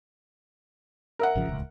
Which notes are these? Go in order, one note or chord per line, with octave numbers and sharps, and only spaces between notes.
A#4 E5 F#5
G#1 C#3 F3
D1 C#2